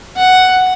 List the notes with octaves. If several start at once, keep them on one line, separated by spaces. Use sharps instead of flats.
F#5